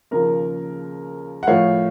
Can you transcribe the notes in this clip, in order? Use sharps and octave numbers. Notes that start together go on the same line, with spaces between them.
D#2 C#3 F3 A#4
F#5
A2 F3 C#5 F5